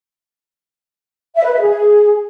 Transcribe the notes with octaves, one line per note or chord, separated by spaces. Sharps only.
E5
B4
E5
G#4